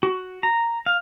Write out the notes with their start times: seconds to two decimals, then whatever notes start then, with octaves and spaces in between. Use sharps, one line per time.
0.03 F#4
0.43 A#5
0.86 F5